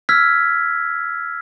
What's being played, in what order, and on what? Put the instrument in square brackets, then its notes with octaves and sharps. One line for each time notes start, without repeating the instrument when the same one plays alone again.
[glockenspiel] E6 F6 G#6 B6